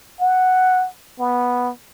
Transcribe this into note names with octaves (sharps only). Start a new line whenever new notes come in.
F#5
B3